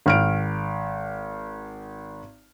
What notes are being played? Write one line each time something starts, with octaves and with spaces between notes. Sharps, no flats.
G#1 F6 D7